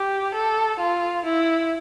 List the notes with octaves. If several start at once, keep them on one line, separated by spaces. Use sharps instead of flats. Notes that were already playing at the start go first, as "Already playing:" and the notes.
Already playing: G4
A4
F4
E4